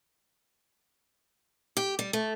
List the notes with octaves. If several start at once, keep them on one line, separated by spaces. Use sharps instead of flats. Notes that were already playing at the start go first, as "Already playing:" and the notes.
G4
G3
A3